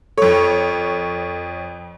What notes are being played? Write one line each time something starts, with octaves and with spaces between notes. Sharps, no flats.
F2 A4 C#5